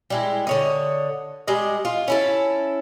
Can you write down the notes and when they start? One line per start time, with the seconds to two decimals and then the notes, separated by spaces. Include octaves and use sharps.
0.10 G3 G#3 E4
0.47 D3 C#5 D#5
1.48 G3 G#3 D#5
1.85 F4
2.08 C#4 E4 A4